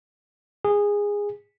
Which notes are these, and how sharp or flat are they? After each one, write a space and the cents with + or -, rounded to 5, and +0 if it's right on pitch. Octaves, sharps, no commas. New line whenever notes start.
G#4 -15